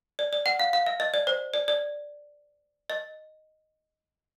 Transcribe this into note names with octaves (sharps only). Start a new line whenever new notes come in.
D5
D5
F#5
F5
F5
E5
D#5
D5
C5
D5
D5
D#5